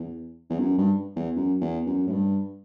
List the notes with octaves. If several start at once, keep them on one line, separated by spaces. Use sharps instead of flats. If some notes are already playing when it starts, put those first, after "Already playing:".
Already playing: E2
E2
F#2
G2
E2
F#2
E2
F#2
A2
G2